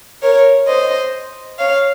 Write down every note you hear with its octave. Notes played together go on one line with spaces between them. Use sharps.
A#4 C#5
C5 D#5
C#5 F5